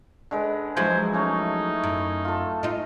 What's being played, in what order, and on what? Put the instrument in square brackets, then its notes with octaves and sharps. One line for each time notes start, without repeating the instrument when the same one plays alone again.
[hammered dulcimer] D3 G#3 B4
[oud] F3 F#3 G#3 [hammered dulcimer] E4 G#5 [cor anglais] C5
[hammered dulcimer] A3 C#4 E4 [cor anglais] D#4
[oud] F#2
[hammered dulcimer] F4 A4
[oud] D#4 F4 [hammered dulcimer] D#5